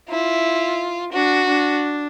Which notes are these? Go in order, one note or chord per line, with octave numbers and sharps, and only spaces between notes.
E4 F4
D4 F#4
D4